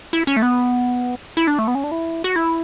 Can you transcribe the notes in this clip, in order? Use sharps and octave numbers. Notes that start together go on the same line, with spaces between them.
E4
C#4
A3
B3
E4
D4
A3
B3
C#4
D4
E4
F#4
E4